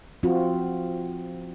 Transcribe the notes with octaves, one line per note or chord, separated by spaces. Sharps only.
F3 C4 F4 F#4